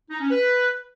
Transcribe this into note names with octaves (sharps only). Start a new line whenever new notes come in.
D#4
C#4
B4